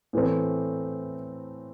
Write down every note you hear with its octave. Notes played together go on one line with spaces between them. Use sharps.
A2 E3 A3 C4